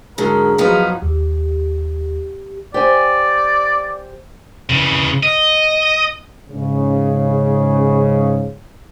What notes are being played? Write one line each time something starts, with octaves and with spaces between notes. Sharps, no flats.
G#2 D3 F#3 G#4 A#4
F3 F#3 B3 D#4 F5
D#2 G4
G4 C5 D5 G#5
C#3 E3
D#5
G#2 C#3